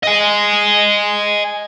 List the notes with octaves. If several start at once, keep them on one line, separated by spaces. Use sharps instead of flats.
D#5 G#5